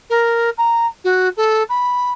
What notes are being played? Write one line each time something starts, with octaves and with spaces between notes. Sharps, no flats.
A#4
A#5
F#4
A4
B5